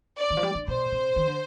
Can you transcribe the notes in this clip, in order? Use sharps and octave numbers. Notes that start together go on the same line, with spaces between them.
D5
D#3
F3
G3
D3
B2 C5
C3
D#3
D3